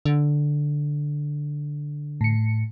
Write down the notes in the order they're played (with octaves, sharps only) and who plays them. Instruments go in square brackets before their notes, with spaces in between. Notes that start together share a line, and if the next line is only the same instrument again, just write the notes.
[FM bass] D3
[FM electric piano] A2 C#7